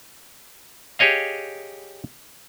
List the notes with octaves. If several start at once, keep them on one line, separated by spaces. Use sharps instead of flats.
G4 G#4 C#5 D#5 F5